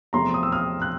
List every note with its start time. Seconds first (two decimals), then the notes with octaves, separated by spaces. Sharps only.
0.13 E2 C3 F3 A3 C4 A#5 C6
0.34 D#6
0.43 E6
0.52 D#6 F6
0.82 F#6